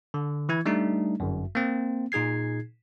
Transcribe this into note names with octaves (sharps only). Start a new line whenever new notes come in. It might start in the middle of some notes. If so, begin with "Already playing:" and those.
D3
E3 E4 G#6
G3 A3 D4 D#4
G1 F#2
A#3 C4
A#2 D#4 G#4 G#6 C7